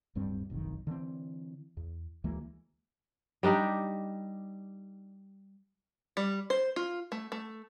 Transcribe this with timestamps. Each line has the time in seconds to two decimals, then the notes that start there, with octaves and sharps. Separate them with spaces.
0.15 D1 G2 G3 C4
0.50 F#1 B1 F2 D#3
0.87 D3 E3 G3 C4
1.77 E2
2.24 D2 E3 G#3 A#3
3.43 G3 D4 D#4 G4
6.17 G3
6.50 C5
6.76 F4
7.12 A3
7.32 A3